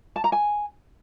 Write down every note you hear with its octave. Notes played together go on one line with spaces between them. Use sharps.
A5
A#5
G#5